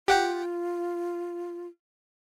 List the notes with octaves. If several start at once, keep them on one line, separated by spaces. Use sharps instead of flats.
F4 G4 F#5 G5